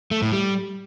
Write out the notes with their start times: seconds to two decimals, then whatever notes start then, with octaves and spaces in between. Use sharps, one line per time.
0.11 A3
0.22 A2
0.33 G3